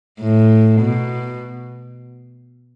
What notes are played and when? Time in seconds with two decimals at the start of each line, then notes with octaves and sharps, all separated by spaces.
0.21 A2
0.81 B2